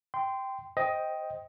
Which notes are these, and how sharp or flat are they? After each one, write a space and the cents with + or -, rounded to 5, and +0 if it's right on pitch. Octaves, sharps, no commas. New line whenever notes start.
G5 +0 C6 -20
C5 +0 D#5 +10 G5 +0